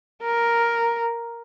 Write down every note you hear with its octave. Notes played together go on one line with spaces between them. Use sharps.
A#4